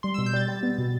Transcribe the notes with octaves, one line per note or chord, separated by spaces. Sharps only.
G3 C6
B2 E6
G6
G3 A6
G3
B3
B2